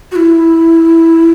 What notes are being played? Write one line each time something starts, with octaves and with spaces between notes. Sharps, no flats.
F#4
E4